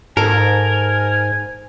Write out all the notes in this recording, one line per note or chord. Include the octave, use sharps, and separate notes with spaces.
G#2 A4 A#4 G#5